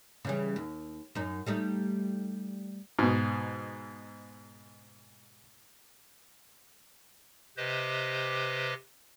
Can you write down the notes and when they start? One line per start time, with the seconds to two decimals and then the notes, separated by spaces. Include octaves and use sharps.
0.25 C#3 E3 G3
0.56 D#2
1.15 F#2 D#4
1.46 G3 A3 D#4
2.99 G#2 B2
7.57 C3 G4 B4 C5 D#5